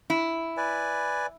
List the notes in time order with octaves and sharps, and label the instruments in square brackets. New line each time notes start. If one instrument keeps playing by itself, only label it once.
[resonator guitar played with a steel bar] E4
[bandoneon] B4 D5 G#5